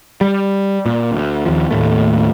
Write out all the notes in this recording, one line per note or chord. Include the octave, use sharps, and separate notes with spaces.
G3
A#2
D2
D#2 F3
D#2 A2 A3